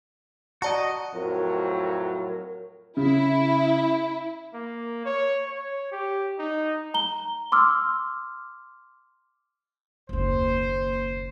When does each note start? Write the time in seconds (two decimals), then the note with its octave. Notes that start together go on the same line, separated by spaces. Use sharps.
0.62 F#4 D5 D#5 A5 A#5
1.13 F2 A2 F#3 A#4
2.97 C#3 E4
4.54 A#3
5.05 C#5
5.46 C#5
5.92 G4
6.39 D#4
6.94 A#5 G7
7.52 C6 D6 E6 F6
10.09 F#1 D#2 C5